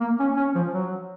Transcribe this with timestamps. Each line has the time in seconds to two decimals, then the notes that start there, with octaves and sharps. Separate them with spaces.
0.01 A#3
0.20 C#4
0.37 C#4
0.55 F3
0.73 F#3